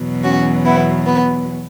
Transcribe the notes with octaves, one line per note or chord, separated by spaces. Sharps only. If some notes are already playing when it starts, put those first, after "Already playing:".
Already playing: E2 B2 F#3
C#4 F#4
B3 E4
B3